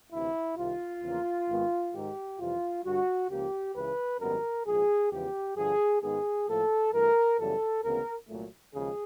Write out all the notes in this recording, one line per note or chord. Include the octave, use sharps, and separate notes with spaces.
D2 C3 E3 E4
C2 C3 D#3 F4
E2 C#3 F3 A#3
G#1 G#2 D#3 G#3 B3
G#2 D#3 G#3 G4
F2 C3 E3 G3 F4
G2 D3 G3 F#4
C#2 C#3 F3 A#3 G4
C#2 C#3 E3 B4
G#1 F#2 D#3 G3 B3 A#4
A#1 G#2 F3 G#4
E2 C#3 F3 G#3 B3 G4
G2 D3 F3 G#4
G#2 D#3 G#3 B3 G#4
A2 F3 A#3 A4
G2 E3 A3 A#4
F#2 C#3 E3 G3 B3 A4
D2 C#3 E3 G#3 B3 A#4
C2 A#2 F#3 A3
D#2 C#3 F3 G#3 G#4